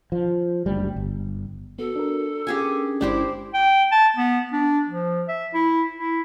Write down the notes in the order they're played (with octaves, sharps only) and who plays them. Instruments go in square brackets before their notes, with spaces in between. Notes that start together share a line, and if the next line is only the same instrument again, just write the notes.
[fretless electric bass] F3
F#1 D2 G3
G1
[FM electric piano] B3 [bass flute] F#4 [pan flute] A4
[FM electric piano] D4 A#4
[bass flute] C#4 [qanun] G4 G#4 G#5
[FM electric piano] G1 G#3 D5 [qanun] D4 G4 C5 [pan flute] E4
[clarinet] G5
A5
B3
D4
F3
E5
E4
E4